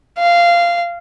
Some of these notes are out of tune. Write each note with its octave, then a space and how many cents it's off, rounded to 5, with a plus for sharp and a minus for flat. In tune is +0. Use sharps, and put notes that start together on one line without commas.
F5 -15